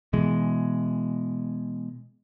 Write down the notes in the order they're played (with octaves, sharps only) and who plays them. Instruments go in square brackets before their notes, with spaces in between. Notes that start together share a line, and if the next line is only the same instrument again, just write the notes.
[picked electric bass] B2 E3 G#3